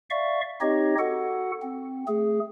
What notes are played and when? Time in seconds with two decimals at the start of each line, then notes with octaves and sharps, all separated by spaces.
0.10 D5 E5 F5 C#6
0.61 C4 D#4 G4 C#5 D#5
0.99 F#4 A4 F#5
1.62 C4
2.08 A3 G#4